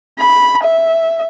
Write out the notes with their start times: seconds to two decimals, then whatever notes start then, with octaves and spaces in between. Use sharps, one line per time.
0.19 B5
0.63 E5